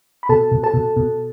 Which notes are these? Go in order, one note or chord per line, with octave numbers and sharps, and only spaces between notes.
B5
B2 A4 A5
B2
A4 A5
B2
B2